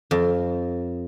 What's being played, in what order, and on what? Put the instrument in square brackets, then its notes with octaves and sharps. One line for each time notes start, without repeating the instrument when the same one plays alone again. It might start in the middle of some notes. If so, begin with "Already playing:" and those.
[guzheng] F2